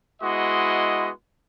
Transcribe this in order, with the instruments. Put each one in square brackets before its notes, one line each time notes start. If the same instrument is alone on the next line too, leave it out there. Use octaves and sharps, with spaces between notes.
[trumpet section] G#3 B3 E4 F#4 D#5 C6